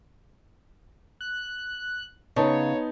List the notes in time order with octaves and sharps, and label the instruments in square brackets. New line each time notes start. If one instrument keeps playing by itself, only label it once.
[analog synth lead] F#6
[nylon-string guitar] C#3 [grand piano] B3 D#4 A5 [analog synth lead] C#5